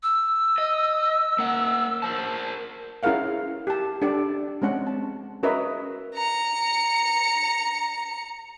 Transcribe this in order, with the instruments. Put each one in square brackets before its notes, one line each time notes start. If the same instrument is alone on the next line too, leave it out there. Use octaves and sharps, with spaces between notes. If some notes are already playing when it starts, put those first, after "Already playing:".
[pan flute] E6
[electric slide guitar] D#5
A#3 F#5
A#4 C5 A5
[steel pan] C#4 E4 G#4 A#4 F5 F#5
G4 A5
D4 G4 A4 D5
G#3 C4 C#4 F#5
A5
C#4 F#4 A#4 B4 D#5 E5
[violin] A#5 C#7